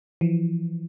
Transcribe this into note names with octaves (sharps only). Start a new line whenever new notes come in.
E3 F3